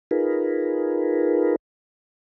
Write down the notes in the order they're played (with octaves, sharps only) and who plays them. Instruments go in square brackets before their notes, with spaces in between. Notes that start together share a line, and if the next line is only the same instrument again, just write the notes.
[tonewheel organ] D#4 F4 G#4 A#4 B4